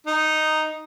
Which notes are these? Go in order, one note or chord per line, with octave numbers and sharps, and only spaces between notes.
D#4